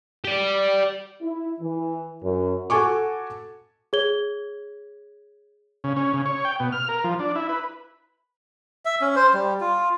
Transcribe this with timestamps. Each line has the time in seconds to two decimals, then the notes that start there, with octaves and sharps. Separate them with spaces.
0.25 G4 D5
1.22 E4
1.61 E3
2.23 F#2
2.70 F#4 A4 G#5 C#6 D6
3.93 G#4 C#5 G#6 G7
5.84 C#3
5.96 C#4
6.14 C#3
6.26 C#5
6.45 G5
6.60 B2
6.72 F6
6.89 A#4
7.04 F3
7.19 D4
7.35 E4
7.49 B4
8.85 E5
9.01 C#4
9.16 C5
9.34 G3
9.61 F4